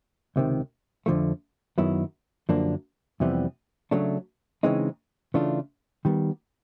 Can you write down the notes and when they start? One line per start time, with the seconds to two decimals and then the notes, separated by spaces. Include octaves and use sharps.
0.36 C#2 C3 D#3
1.06 F2 D3 F3 A3
1.78 F#2 D#3 F#3 B3 E4
2.49 F#2 D3 F3 A#3 D4
3.20 F2 C3 E3 G3 B3
3.91 C#3 F#3 A3 D4
4.63 C#3 E3 G#3 C4 D#4
5.34 C#3 E3 A3 D4 F4
6.05 D#3 G3 B3